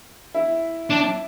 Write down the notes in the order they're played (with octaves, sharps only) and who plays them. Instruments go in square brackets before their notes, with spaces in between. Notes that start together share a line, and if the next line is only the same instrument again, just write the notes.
[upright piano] E4
[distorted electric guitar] D4